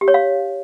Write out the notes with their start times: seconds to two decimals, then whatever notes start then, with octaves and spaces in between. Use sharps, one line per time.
0.01 G4
0.08 C#5
0.14 F5